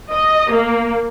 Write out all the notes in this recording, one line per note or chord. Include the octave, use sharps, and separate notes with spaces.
D#5
A#3